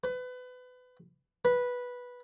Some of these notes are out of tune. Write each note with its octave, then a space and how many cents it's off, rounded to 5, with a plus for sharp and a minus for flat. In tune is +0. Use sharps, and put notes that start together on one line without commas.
B4 +25
B4 -10